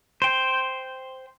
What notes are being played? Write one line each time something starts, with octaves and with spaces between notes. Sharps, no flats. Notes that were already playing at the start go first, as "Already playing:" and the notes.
C5 G5